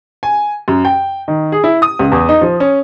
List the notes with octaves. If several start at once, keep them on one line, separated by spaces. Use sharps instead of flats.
G#5
F#2
G5
D#3
G#4
E4
D#6
C#2
E2
D#4
F3
C#4